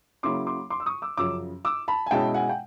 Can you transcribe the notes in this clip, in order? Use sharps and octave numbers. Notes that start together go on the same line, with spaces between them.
C#3 F#3 A#3 C#4 E4 C6 D6
C6 D6
C6 D6
E6
C#6 D#6
D6 E6
F#2 C#3 F3 D6 E6
D6 E6
A5 B5
G#5
B2 G#3 C#4 E4 G5 A5
F#5 G#5
G5